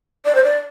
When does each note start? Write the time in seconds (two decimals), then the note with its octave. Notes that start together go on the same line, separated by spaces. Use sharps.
0.25 D5
0.35 C5
0.44 D5